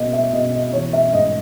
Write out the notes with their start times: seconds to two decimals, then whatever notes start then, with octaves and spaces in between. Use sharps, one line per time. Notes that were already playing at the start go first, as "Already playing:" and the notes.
Already playing: B2 A#3 D#5
0.13 E5
0.33 B2 D#5
0.53 D#5
0.73 E3 C#5
0.93 E5
1.13 G#2 D#5